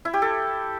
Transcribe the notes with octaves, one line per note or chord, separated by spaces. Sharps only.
E4
G4
A4